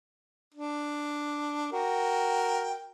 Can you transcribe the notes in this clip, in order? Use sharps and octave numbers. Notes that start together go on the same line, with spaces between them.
D4
F#4 A#4 G5